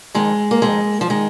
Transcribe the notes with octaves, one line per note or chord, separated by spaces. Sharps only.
F2 D#3 G#3
A#3
F2 D#3 G#3
F3
D#3 G#3